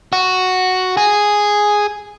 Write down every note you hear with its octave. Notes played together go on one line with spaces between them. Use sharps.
F#4
G#4